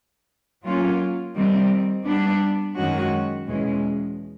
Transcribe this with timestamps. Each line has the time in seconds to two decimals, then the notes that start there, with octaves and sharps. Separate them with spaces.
0.64 F#3 A#3 C#4 F4
1.35 D#3 G3 C4
2.05 G3 B3 D4
2.76 F#2 D#3 G#3 C#4 F#4
3.46 E2 B2 G#3 C#4